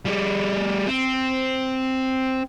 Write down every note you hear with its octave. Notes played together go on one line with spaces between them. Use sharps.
G3 G#4
C4